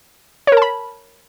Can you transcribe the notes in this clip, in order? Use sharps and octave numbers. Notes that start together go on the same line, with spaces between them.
A#4 C#5 A5 B5